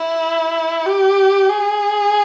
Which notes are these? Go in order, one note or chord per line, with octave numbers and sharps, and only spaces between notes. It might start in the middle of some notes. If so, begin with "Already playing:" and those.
Already playing: E4
G4
G#4